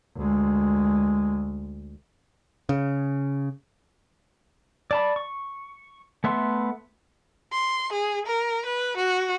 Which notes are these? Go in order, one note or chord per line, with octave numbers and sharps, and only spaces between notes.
D2 G#3
C#3
D5 A5 B5
C#6
A3 B3 E5 C6
C6
G#4
A#4
B4
F#4